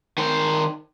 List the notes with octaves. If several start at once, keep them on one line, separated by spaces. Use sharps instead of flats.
D#3 C5